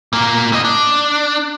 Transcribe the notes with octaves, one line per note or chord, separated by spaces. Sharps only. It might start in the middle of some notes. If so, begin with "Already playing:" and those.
A#2 A#3
A2 D#5
D4